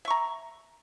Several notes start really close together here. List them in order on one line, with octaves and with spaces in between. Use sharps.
E5 C#6 A#5